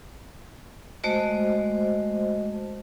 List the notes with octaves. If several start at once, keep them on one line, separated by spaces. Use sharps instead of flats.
G#3 A3 F#4 C5 D#5